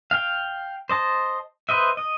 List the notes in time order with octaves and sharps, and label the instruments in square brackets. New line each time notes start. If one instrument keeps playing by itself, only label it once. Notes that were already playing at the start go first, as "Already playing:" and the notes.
[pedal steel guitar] F5 G5
C5 D#5 A5
B4 C5 D#5 E5
D#5